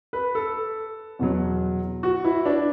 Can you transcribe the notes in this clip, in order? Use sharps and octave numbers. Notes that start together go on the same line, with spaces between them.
B4
A4
E2 B2 F#3
F#4
E4
D4